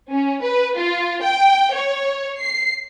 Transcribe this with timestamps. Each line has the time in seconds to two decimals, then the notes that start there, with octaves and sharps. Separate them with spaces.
0.11 C#4
0.42 B4
0.77 F4
1.22 G5
1.73 C#5
2.40 C7